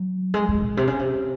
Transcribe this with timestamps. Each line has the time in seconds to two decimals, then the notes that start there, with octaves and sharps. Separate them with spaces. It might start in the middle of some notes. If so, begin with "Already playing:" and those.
Already playing: F#3
0.34 G#3
0.49 G#3
0.62 A#2
0.77 C3
0.87 C#3
0.99 C3